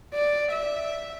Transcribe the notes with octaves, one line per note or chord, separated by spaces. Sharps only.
D5
E5